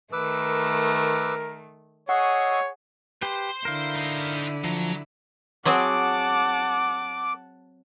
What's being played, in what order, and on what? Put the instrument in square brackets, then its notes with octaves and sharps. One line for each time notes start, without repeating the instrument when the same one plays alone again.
[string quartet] D#3 A3 [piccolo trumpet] A#4 [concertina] B4 D6 E6
[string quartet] G#4 [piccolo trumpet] C#5 [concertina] D#5 C#6 E6 [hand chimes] F#5
[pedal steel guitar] G4 B4 [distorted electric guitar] C5 C6
[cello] D3 E4 [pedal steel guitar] A#4 F5
[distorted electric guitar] D#4 C5
[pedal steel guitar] F3 [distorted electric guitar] F#3
[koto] F#3 C4 G#4 [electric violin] F#5 A5 [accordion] D6